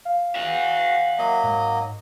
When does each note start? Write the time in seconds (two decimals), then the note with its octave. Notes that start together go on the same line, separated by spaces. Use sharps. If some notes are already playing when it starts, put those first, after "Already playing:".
0.05 F5
0.35 F#4 E5 F#5
1.18 F#3 A#3 D#5
1.43 G#2